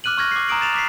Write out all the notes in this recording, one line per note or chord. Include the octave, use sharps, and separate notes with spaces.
D6 F6 F#6 D#7 F#7
C#6 F6 G#6 A#6
D6 C7
A#5 D#6 D7 F#7
A6 E7 F7
D6 B6 C7